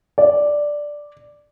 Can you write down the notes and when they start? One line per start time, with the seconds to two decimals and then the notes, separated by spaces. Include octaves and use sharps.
0.18 D5